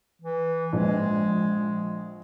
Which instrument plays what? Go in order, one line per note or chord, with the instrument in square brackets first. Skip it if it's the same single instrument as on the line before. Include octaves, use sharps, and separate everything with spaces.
[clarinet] E3
[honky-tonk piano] A#1 [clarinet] G#3